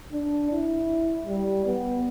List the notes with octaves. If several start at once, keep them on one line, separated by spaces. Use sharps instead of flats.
D4
E4
G3
B3